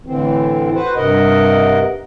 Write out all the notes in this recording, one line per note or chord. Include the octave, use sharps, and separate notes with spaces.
A2 D3 E3 C4
F#4 B4 C5
G2 C3 A#4 D#5 F#5